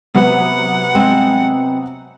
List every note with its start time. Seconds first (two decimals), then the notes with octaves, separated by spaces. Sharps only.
0.14 C3 F#3 B3 F#5
0.95 G#3 C4 G#5